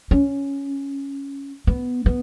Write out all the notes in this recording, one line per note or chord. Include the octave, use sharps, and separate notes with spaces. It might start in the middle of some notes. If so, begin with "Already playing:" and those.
C#4
B3
B3